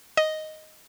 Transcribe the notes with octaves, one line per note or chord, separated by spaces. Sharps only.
D#5